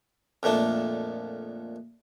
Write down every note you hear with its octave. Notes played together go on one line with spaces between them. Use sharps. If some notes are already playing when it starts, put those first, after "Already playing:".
F2 A#2 A3 D4